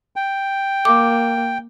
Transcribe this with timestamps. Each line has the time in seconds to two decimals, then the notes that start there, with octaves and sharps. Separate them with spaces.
0.16 G5
0.85 A#3 D6